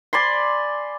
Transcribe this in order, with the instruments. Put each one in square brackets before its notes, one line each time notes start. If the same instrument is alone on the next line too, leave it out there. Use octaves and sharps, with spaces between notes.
[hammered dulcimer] D5 G#5 B5 C6